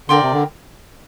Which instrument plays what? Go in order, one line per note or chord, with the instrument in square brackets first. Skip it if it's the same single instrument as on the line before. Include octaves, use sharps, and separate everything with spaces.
[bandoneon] D3 [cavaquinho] A#4 D5 G5 C6
[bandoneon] C3
D3